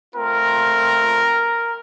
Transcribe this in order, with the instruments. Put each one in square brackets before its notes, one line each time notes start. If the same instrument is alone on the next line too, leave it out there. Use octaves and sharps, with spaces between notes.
[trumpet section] A3 C4 F4 A#4